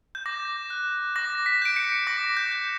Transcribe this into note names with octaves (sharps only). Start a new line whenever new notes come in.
G6
D6 A#6
F#6
D6 A#6
B6
G6 D7
C#7
D6 A#6
G6
G6